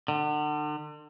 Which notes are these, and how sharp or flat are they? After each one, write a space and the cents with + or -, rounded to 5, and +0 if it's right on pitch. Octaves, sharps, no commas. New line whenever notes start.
D3 +40